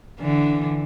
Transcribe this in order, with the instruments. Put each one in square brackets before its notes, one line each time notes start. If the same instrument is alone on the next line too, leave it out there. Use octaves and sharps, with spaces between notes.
[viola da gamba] D3 E3